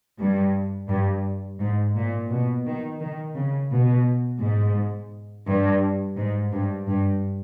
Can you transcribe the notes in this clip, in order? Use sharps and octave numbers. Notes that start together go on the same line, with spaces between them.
G2
G2
G#2
A#2
B2
D#3
D#3
C#3
B2
G#2
G2
G#2
G2
G2